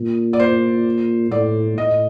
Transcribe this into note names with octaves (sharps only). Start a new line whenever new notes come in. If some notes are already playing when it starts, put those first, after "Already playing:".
Already playing: A#2
D5
C5
A2 D5
A2 D#5